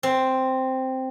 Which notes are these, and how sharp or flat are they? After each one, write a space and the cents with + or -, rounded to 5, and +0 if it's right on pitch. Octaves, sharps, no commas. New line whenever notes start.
C4 +0